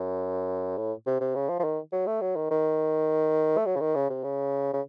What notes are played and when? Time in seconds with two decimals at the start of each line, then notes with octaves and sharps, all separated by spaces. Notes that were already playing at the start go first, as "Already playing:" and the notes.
Already playing: F#2
0.78 A2
1.06 C3
1.21 C3
1.35 C#3
1.49 F3
1.59 F3
1.64 D#3
1.92 F#3
2.07 A3
2.21 F#3
2.36 D#3
2.51 D#3
3.57 A3
3.66 F#3
3.76 C#3
3.80 D#3
3.95 C#3
4.10 C3
4.24 C#3
4.73 C#3